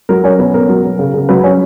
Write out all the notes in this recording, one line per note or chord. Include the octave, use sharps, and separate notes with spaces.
F#3 A#4
C#4 C#5
B2 B4
B2 A#4
F#3
B3
C#3
C#3
F#3 B4
C#4 C#5